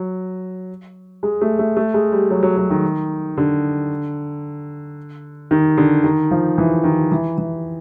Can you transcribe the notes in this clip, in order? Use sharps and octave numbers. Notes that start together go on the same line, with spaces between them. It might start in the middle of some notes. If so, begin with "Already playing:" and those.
Already playing: F#3
G#3
A3
A3
A3
G#3
G3
F#3
F#3
F#3
D#3
D3
D#3
D3
D#3
F3
E3
D#3
E3
E3